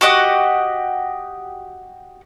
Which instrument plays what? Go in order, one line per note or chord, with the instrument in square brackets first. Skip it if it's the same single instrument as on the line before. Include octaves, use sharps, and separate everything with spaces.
[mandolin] F#4 G4 D#5 F#5